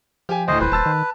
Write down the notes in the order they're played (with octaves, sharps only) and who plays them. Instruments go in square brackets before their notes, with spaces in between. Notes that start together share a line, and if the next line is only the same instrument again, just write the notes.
[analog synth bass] F3 [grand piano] G4 G#5
[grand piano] D2 A2 [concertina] C5 D#5
[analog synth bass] D#1 [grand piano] E3 [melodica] B4 [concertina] C5
[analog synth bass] D#1 [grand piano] A5 E6 A6
[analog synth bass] D#3